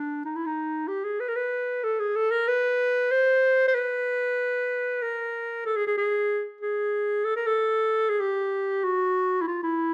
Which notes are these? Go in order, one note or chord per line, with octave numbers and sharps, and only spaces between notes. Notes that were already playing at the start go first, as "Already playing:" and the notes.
Already playing: D4
D#4
E4
D#4
G4
G#4
B4
A#4
B4
A4
G#4
A4
A#4
B4
C5
C5
B4
A#4
A4
G#4
G#4
G#4
G#4
A4
A#4
A4
G#4
G4
F#4
E4
F4
E4